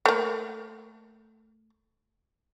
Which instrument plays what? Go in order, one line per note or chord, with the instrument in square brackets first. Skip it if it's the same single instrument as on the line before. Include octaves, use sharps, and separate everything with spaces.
[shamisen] A3 A#3